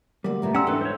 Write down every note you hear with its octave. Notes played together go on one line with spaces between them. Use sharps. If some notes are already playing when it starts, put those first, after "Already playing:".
D2 F#3 G3 A#3 D5 F#5
F2 B2 A3 G4 A#5
C#4 D5 D#5 F#5 G5 C6 E6
G#2 E3 D4 A4 B4
C5 C#5